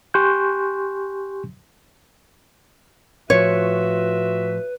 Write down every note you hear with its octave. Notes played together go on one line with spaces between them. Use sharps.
G4 G#5 C6 C#6 F#6 G6
A2 F3 F4 F#4 B4 C#5 E5